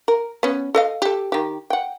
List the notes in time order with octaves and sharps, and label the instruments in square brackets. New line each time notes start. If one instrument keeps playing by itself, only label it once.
[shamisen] A#4
B3 C#4
A4 D#5 F5
G4 A4
D#3 G4
F#5 G5